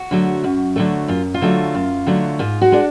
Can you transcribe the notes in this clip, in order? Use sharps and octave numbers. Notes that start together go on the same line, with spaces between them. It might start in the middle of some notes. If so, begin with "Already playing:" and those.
Already playing: F#4
D3 F#3 A3
F#2
D3 F#3 A3
F#2 F4
F4
D3 F#3 A3
F#2
D3 F#3 A3
G#2 F4
F#4
G#3 D4